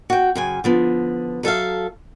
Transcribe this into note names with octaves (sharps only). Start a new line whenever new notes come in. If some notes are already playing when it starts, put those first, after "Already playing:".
F#4 G5
F#2 C#3 G#5
D3 F3 B3
F#3 A4 E5 F5